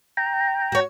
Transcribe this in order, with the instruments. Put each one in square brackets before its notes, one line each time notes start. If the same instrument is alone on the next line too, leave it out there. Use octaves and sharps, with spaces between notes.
[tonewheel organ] G5 A#5
[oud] F#4 C#5